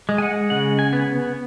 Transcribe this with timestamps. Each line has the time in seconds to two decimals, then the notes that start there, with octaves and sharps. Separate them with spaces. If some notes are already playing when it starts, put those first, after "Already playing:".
0.09 G#3
0.18 G#5
0.22 F#5
0.50 C#3 F#5
0.79 G#5
0.93 B3